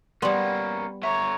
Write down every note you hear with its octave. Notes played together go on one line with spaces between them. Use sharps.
G3 A#3 B3 C#4 D5 C6 F#7
D3 C#5 E5 A#5